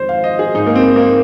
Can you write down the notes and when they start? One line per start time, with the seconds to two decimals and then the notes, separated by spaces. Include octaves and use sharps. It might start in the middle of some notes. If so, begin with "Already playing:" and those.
Already playing: F2 D#3 G#3 C5
0.09 F5
0.24 D#5
0.39 G#4
0.54 G#2 G#3 D#4
0.67 A#3
0.75 C4
0.96 A#3